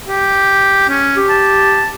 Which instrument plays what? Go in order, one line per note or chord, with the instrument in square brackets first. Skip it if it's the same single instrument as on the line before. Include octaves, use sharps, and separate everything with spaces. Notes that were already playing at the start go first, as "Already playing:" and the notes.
[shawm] G4
C#4
[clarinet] G4
[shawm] A5